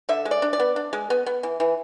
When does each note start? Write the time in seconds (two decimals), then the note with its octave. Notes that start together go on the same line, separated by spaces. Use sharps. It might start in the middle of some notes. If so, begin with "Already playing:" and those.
0.09 D3 E5
0.25 G#3
0.31 D5
0.42 D4
0.53 D5
0.60 B3
0.76 D4
0.93 G#3
1.10 B3
1.26 B3
1.43 E3
1.60 E3